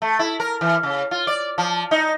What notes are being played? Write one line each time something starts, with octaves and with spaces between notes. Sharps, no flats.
A3
E4
A#4
E3
C#3
F4
D5
F3
D#4